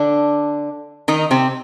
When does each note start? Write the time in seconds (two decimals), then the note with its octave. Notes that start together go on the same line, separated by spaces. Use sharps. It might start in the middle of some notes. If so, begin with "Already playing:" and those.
Already playing: D3 D4
1.08 D#3 D#4
1.31 C3 C4